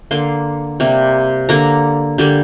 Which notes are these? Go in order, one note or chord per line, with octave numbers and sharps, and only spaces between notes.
D3 A#3 C6
C3 G3 A#3
D3 A#3 A#5
D3 G3 A#3